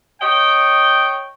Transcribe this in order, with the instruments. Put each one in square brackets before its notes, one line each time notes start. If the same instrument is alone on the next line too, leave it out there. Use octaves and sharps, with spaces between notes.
[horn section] C#5 D#5 G5